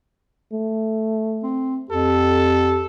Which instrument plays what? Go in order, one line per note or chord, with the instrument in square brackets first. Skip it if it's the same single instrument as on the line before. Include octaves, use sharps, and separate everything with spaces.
[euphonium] A3
[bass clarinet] C4
[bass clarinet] F2 [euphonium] G4 [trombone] A4